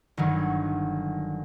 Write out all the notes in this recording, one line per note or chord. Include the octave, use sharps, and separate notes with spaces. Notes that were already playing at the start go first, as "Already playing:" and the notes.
G1 D#3 F#3